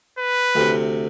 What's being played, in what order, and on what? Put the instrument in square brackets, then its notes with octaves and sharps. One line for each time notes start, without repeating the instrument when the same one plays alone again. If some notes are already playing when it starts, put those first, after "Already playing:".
[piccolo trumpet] B4
[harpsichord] D2 C3